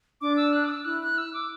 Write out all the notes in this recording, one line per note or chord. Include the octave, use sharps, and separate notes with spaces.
D4 D6
E6
F#6
D6
E6
E4 F#6
F#6
E6
D6